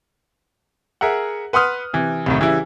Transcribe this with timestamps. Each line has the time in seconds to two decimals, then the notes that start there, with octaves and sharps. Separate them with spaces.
1.01 G#4 A#4 E5 F#5
1.53 B4 F#5 C6 D#6 F6
1.93 C3 E3
2.26 C2 A2 D#3
2.40 C#3 E3 G3 E4